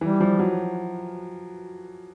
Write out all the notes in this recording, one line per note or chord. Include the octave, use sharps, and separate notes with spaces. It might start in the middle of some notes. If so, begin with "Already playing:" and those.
E3 G3
F3
F#3